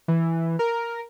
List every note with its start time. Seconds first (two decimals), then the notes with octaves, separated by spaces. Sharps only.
0.08 E3
0.59 A#4